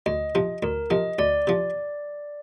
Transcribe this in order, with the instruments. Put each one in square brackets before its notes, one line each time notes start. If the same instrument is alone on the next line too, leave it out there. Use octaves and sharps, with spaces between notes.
[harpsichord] D2 [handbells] D#5
[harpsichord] C3 F3
[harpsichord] D2 [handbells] A#4
[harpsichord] C3 F3 [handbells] D#5
[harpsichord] D2 [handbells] D5
[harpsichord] C3 F3